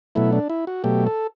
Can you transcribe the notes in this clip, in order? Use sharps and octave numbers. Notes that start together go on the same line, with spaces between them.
B2 F#3 A3 E4
D4
E4
F#4
B2 F#3 A3 G4
A4